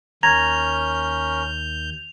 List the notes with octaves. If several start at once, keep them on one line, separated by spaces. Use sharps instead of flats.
D#2 C#4 A#4 A#5 G6 G#6 A#6 F7